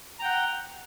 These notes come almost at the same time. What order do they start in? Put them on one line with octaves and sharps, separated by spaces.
A#5 G5 F#5